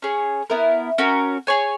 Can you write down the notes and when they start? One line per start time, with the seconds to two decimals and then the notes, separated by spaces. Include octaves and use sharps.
0.02 C#4 G#4 C#5
0.50 B3 E4 A#4
0.98 C#4 F#4 A#4
1.47 G#4 C#5 G#5